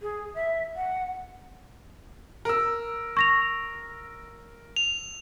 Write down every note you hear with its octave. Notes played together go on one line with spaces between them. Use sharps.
G#4
E5
F#5
A#4 E6
C#6 A#6 F7
F7